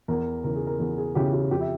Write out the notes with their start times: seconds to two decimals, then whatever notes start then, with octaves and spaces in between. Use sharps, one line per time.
0.08 E2 A#4
0.44 C#3 E3 A#4
0.56 G#4
0.67 A#4
0.80 E2 G#4
0.98 G#4
1.15 C#3 E3 G4
1.33 G4
1.51 F2 G4
1.61 E5